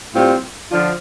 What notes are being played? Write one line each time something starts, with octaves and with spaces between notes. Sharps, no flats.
A2 G3 C4 F4
D3 F3 D4 F4